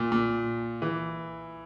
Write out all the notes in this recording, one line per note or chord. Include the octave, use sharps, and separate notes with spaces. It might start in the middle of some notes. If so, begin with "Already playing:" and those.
Already playing: A#2
A#2
E3